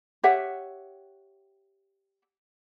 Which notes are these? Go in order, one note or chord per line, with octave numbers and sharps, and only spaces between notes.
G4 C#5 E5 F#5